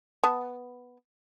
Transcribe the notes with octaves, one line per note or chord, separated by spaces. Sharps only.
B3 A5